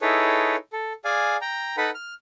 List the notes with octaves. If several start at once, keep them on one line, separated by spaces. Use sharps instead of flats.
D#4 E4 G#4 A4 B4 C#5
A4
G#4 D5 F5 G#5
G5 A#5
D#4 A4 B4 F#5 B5
F6